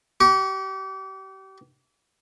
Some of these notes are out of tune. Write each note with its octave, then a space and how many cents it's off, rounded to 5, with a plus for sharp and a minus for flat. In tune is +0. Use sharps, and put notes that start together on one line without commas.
G4 -35 C#6 +0